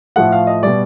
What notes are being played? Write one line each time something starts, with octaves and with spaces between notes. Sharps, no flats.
A2 F3 A3 F#5
F5
D#5
B2 G3 D5